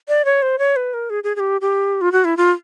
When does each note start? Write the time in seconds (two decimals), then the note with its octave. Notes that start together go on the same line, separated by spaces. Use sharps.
0.08 D5
0.25 C#5
0.42 C5
0.59 C#5
0.76 B4
0.94 A#4
1.10 G#4
1.24 G#4
1.36 G#4
1.40 G4
1.61 G4
2.01 F4
2.12 F#4
2.25 E4
2.37 F4